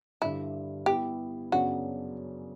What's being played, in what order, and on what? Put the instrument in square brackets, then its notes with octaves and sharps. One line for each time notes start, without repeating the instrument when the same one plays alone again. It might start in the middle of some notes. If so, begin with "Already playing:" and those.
[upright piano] G2 D3 G3 [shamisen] E4
[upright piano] G3 B3 E4 [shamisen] G4
[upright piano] F#2 C#3 F#3 B3 D4 [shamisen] F#4